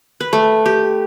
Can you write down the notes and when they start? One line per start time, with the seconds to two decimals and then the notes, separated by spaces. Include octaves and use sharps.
0.20 B4
0.33 A3
0.66 G4